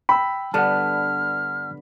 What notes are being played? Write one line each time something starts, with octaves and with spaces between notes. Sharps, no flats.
G5 B5 E6
G2 D3 B3 F#5 A5 F6